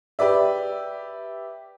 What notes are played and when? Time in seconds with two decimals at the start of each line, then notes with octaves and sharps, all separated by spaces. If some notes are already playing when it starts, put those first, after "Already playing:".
0.19 G4 B4 D5 E5